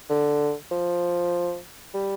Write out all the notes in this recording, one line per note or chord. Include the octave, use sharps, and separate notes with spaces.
D3
F3
G3